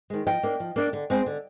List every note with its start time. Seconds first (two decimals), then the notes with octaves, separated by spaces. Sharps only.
0.10 D#3 G#3
0.26 F3 D#5 G5
0.43 A#3 D4
0.60 F3
0.76 A#3 D4
0.93 D3
1.10 G#3 C4
1.26 D3